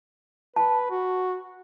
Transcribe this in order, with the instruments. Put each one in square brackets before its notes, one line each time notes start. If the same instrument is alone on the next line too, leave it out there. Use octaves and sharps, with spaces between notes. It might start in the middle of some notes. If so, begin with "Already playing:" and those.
[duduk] B4 [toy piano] A5
[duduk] F#4